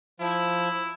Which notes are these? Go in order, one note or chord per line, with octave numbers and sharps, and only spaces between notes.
F3 E4